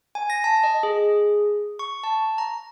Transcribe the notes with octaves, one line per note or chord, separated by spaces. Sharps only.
G#5
A#6
A5
D#5
G#4
C#6
A5
A#5